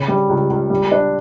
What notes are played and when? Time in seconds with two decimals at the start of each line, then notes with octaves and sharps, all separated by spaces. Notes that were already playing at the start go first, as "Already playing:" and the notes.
Already playing: C#3
0.08 G3
0.29 C#2
0.50 C#2
0.70 G3
0.92 D4